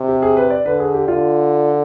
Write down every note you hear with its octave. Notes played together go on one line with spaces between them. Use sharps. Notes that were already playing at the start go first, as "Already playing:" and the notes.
Already playing: C3
G4
G#4
B4
D5
D3 B4
G#4
G4
D3 F4